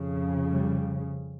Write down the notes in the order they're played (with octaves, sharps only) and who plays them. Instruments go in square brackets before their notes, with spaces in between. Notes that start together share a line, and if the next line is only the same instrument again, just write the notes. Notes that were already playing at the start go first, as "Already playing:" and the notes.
Already playing: [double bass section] F2 C#3
G3